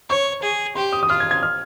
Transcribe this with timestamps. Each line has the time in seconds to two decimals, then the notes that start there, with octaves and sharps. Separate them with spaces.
0.09 C#5 C#6
0.43 G#4
0.75 G4 C6
0.92 D#6
1.03 D#6
1.09 F4 F6
1.20 G#6
1.31 G#6
1.43 F6